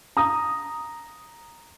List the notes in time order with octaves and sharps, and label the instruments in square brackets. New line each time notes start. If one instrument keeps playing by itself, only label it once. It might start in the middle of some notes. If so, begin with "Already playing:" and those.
[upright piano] A#5 D#6